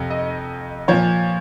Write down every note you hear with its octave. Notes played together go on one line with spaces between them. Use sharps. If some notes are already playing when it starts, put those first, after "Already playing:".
Already playing: F2 C3
D#5
A#2 F3 C#5